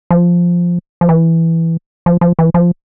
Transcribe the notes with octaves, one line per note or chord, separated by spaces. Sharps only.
F3
F3
E3
F3
F3
E3
F3